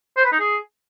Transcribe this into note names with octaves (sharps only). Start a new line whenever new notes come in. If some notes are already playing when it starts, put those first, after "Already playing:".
C5
B4
D#4
G#4